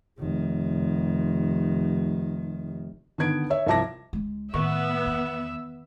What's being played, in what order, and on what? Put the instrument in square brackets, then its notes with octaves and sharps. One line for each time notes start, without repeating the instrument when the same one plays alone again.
[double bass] F1 D#3
[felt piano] D3 D#3 B3 G#6 D7
C#5 E5
C2 F3 E5 A5 D6 A#6
[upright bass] C#2 G#3
[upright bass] A2 [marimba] D#3 C#6 [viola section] B3 [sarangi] E5
[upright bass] E2